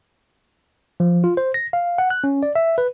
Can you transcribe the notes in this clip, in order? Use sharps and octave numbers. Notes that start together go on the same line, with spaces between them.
F3
F4
C5
A#6
F5
F#5
F#6
C#4
D5
E5
B4